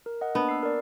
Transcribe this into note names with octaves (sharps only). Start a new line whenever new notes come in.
A#4
D#5 F#5
A#3 B3 D4
E6 C7
A#4 D5